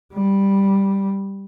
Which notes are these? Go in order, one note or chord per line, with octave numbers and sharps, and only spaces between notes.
G3